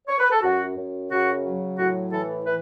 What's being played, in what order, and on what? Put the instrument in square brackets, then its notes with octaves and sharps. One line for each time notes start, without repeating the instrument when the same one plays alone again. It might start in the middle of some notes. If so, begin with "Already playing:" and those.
[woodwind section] C#5
B4
A4
F#2 F#4
F#2
C#3 F#4
F#3
A2 F#4
E3 A4
E3 B4